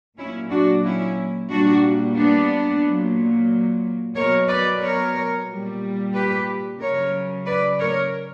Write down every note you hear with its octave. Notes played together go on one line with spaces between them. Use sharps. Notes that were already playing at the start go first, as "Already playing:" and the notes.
A#2 F#3 C#4 E4
D4 F#4
C#4 E4
A#2 G3 D4 F#4
B3 D4
A#2 F#3
B2 F#3 A#4 C#5
B4 D5
A#4 C#5
A#2 G3
G4 B4
C#3 F#3 A#4 C#5
B4 D5
A#4 C#5